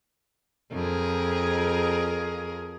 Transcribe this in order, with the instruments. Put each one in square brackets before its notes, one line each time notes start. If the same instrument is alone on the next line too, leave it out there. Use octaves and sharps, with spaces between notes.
[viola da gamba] F2 G#4 A#4